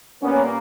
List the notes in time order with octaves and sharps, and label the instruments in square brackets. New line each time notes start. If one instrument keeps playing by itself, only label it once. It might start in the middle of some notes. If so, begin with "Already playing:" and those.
[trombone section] A#2 G3 A#3 [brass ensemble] B3 C#4